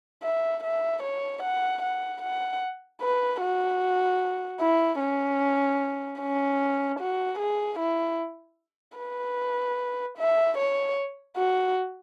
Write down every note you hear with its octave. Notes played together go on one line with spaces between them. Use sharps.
E5
E5
C#5
F#5
F#5
F#5
B4
F#4
E4
C#4
C#4
F#4
G#4
E4
B4
E5
C#5
F#4